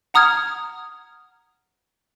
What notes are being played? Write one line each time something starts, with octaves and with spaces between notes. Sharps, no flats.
F#5 A#5 D#6 F6 G#6